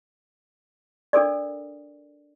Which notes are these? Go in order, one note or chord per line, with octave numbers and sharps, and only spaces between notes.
D4 A4 A#4 D5